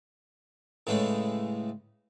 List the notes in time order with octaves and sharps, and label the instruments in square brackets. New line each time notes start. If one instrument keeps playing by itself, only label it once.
[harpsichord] A2 C#3 E3 G#3 A3